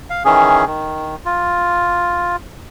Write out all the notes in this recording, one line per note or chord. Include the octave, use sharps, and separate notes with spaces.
F5
D#3 E3 C#4 G#4
D#3
F4